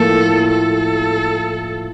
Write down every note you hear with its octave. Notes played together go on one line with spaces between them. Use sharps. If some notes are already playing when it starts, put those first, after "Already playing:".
Already playing: A2 F3 A#3 A4
A4